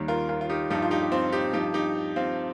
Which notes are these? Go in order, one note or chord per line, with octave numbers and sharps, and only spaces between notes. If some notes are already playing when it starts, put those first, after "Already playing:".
Already playing: D#2 D#3 G3
F4 A#4
F4 A#4
F4
D#4 G4
G2 F3 D#4 G4
F4
D#4 G4
G4
C4 F4
D#4 G4
G2 F3 D#4 G4
D#4 G4
C4 F4